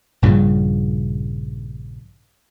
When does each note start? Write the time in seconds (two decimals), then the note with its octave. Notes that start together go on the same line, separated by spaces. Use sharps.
0.22 A#1 G2 A#2 C#3